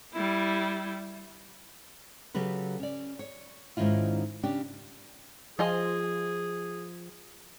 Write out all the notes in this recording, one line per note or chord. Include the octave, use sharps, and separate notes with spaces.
G3 E4
C#3 F#3 G4 A4 B4
C#4 D5
C#5
G#2 D#3 C#4 E4 F4
C#3 C#4 D4 G4
F3 F4 G#4 D#5 G#5